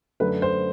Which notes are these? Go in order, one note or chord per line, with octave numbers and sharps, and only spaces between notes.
F#2 D3 A3 B4
C5